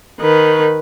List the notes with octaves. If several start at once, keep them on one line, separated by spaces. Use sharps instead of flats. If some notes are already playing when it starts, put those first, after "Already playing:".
D#3 B4